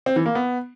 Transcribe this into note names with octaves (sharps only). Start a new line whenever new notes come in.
C4
E3
A#3
B3